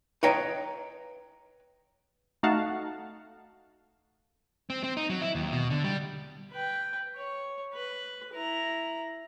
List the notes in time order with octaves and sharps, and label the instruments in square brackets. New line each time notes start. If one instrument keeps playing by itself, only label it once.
[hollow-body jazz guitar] B4 C#5 D#5 G5 A#5
[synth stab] A3 D#4 F#4 F5 F#5 A5
[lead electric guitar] C4
C4
D#4
F#3
E4
D#2
B2
D3
G3
[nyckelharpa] B4 G5
C#5
B4
E4 A#5